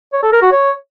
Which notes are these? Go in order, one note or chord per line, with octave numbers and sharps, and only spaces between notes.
C#5
A4
A#4
F#4
C#5